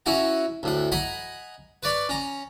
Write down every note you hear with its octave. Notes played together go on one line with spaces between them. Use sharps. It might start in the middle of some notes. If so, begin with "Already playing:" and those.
C#4 E4 F#4 F#5 G#5 A#5
D2 A2 F#5
D#5 F#5 G#5 A#5 B5
B4 C#5 D5 B5
C#4 A#5